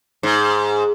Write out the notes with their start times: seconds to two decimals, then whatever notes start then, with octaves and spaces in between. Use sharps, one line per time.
0.23 G#2